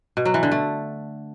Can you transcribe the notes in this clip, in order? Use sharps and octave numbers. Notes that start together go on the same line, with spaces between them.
B2
F#3
E3
D3
A3